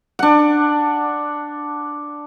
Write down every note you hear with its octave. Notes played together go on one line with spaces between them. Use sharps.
D4 F#5